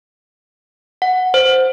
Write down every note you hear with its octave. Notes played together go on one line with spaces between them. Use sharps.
F#5
C5